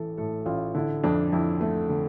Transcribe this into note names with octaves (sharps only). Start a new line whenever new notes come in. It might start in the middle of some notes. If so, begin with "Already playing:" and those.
Already playing: A1 A2 E3 A3 A4
A2 A4
A1 F4
D3 E4
F2 D4
F2 E4
A3
D3